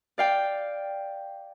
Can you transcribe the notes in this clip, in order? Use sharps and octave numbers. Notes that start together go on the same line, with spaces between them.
D5 F5 G5